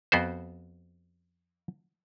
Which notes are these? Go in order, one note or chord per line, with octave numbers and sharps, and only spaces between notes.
F2 B3 F#4 C5